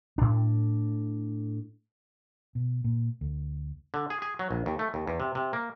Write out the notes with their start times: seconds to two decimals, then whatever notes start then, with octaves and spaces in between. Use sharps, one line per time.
0.18 A2 D4
2.55 B2
2.84 A#2
3.21 D2
3.94 D3
4.10 G#4
4.22 G#4
4.39 F#3
4.51 A#1
4.66 D#2
4.79 A3
4.94 D#2
5.07 E2
5.20 C3
5.35 C3
5.53 A#3